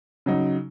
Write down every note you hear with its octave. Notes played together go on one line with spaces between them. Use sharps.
C#3 F#3 D#4